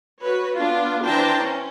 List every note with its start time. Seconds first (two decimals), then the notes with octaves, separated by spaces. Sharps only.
0.21 F#4 B4 C#5
0.58 B3 D4 F4
1.03 E3 D4 C5 G5 A5 A#5
1.39 C#4